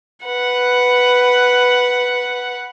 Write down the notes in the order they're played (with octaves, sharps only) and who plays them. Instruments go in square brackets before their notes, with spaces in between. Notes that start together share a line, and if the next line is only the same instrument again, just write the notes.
[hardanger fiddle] B4 F#5